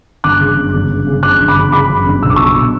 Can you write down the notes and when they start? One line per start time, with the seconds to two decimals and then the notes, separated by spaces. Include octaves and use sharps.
0.24 G1 D6 F#6
0.40 C#3
0.57 F#2
0.74 G1
0.90 G1
1.07 C#3
1.23 F#2 D6 F#6
1.40 G1
1.48 B5 D6
1.56 G1
1.72 C#3 B5 D6
1.89 F#2
2.06 G1
2.22 B1 E6
2.30 D6
2.36 F#3 C#6 E6
2.55 B2